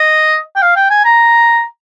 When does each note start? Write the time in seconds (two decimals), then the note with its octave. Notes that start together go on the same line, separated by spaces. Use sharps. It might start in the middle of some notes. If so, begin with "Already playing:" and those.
Already playing: D#5
0.56 G5
0.62 F5
0.76 G5
0.90 G#5
1.04 A#5